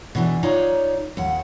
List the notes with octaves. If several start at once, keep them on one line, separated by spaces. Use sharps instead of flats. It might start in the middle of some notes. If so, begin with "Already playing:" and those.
B2 E3 D4
D#4 F4 C#5 D5
D#2 F#5